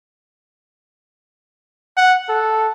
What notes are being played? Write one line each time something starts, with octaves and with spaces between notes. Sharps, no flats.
F#5
A4